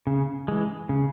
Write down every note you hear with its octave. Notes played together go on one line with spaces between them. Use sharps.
C#3
E3 G#3
C#3